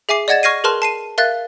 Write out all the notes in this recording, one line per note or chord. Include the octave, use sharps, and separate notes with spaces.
G#4 E5 G#5 D6 C7
D5 D#5 F#5 G#6 A6 E7
C#6 F6 G#6 A#6 C7 D#7
G#4 A#4 B4 A5 C6 F6
A5 C7 D#7
A#4 E5 F5 F#6 A6